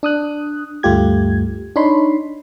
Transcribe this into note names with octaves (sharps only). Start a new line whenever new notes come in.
D4 D#6 F#6
D2 G2 A3 F4 G4 G#6
D4 D#4 C#5 B5 C6